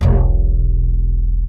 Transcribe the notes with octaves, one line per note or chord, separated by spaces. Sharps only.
E1 B1